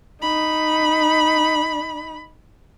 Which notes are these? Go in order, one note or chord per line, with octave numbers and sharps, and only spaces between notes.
D#4 B5